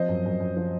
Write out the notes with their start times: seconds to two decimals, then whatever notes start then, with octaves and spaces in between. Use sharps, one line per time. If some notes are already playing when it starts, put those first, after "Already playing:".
Already playing: F3 C4 C5 D#5
0.08 F#2
0.25 F#2
0.40 F#2
0.57 F3